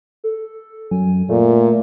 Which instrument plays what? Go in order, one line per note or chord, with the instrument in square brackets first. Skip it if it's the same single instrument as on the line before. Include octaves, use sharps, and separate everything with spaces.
[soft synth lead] A4
[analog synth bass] F#2 [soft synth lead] G#5
[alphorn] A#2 [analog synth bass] A3 [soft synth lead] F4